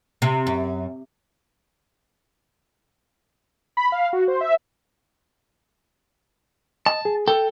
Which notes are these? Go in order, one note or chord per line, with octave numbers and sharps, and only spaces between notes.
C3
F#2
B5
F5
F#4
C5
E5
D#5 A5
G#4
A4 G5